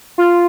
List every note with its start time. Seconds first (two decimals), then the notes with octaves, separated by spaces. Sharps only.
0.18 F4